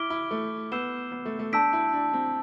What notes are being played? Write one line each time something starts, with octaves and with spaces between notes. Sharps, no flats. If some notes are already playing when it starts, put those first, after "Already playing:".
Already playing: E4 D6 F6 B6 D7 G7
E4
A3
B3 E6 G6 C7 E7 G7
B3
A3
A3
D4 A5 E6 G6 B6 D7
E4
D4
C4